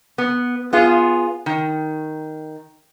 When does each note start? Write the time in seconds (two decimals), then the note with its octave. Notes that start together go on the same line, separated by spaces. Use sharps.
0.18 B3
0.73 B3 F4 G#4
1.46 D#3